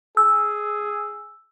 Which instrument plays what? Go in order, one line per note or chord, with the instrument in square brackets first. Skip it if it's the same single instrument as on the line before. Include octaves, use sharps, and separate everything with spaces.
[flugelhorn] G#4 [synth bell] E6